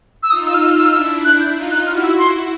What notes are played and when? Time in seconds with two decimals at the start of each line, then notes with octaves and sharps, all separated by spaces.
0.23 E6
0.30 D#4 F4 D#6
0.46 E6
0.54 F6
0.61 E6
0.70 F6
0.78 E6
0.86 F6
0.93 D4 E4 E6
1.24 F#6
1.40 G6
1.55 D#4 F4
1.71 F#6
1.86 E4 F#4 F6
2.03 E6
2.18 C6